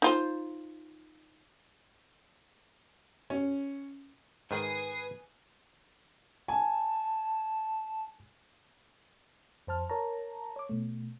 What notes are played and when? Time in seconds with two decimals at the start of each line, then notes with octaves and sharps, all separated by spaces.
0.02 D#4 F4 C5
3.30 C#4
4.51 G#2 D#3 B4 G#5 D#6 C7
6.48 G#5 A5
9.67 F2 C5 A5 F6
9.90 A#4 C#5 A5 A#5
10.56 C#5 D6
10.69 B2 A3